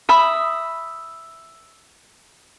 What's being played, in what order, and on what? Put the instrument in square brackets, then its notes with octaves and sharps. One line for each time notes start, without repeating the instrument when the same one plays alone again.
[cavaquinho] E5 B5 D#6